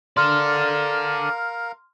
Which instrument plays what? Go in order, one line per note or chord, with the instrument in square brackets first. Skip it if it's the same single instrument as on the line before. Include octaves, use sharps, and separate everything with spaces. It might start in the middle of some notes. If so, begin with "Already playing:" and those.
[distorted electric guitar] A4 D5 [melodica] A#4 F5 [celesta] C6 F6